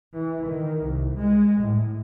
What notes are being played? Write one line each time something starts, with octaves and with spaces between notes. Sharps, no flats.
E3
D#3
C2
G#3
A2